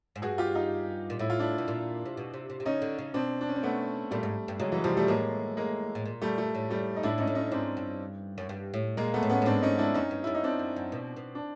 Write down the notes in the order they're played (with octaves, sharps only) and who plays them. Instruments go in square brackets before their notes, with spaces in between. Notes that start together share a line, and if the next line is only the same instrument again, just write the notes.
[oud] G#2
[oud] G2 [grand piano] F#4 G#4
[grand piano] F4 G4
D#4 F4
[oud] A#2
[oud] A2 [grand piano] E4
[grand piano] F4
D4 E4
[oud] B2
A#2
C3
B2
C3
C3
C3
[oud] C#3 [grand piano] C#4 D#4
[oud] D3
C#3
[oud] B2 [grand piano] C4 D4
[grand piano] D4
C#4
C4
A3 B3
[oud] A#2 [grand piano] G3 A3
[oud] G#2
G2
[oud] C#3 [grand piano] F#3 G#3
[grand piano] E3 F#3
[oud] C3 [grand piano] F3 G3
[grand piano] G3 A3
[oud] A2 [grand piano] G#3 A#3
[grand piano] G#3 A#3
[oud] A2
A#2
[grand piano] G3 A3
G3 A3
[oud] A2
[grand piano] G3 A3
D#4
[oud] A2 [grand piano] D4 E4
[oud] G#2 [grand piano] C#4 D#4
[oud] A2
[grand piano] C#4 D#4
[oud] G#2 [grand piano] C4 D4
[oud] G2
F#2
G2
A2
[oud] A#2 [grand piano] G#3 A#3
[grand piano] A3 B3
[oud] A2
[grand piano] B3 C#4
[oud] A2
[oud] G#2 [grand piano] C4 D4
[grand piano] C#4 D#4
D4 E4
[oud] F#2 [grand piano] C#4 D#4
[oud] G2
[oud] F#2 [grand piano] E4
[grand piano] D#4
[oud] F#2 [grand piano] C4 D4
[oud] F#2
F#2
B2
B2
[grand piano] D4